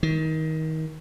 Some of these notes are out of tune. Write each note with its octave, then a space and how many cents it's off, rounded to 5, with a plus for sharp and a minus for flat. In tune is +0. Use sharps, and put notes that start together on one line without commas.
D#3 +25